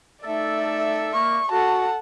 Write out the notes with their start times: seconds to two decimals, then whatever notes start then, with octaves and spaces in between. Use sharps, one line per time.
0.24 A3 D#4 A4 D5 E5
1.14 A#3 C#6
1.51 F#4 A4 F#5 A5